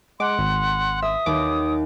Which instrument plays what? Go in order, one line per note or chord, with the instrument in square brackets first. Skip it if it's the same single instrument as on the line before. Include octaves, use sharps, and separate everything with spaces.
[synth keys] G#3 D6 [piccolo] F#5 [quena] C6
[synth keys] G#1
[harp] E5 [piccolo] D#6
[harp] D#2 [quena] C#5 [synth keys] D6